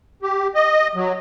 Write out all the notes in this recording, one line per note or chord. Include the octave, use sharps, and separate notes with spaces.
G4
D#5
F#3